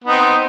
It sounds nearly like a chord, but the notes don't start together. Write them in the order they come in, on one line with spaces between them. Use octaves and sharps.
B3 D#4 C4